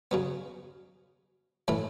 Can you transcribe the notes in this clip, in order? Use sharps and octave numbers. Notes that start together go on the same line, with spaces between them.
C#3 F#3 B3
A2 E3 A3 E4